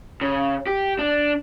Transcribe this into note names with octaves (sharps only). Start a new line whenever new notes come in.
C#3
G4
D4